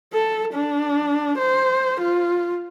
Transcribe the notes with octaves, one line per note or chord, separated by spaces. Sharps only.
A4
D4
C5
F4